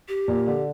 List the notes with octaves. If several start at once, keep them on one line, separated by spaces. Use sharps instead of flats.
G4
A#2
D3